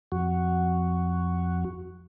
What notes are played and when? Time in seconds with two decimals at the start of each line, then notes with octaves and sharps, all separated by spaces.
0.12 F2 F#4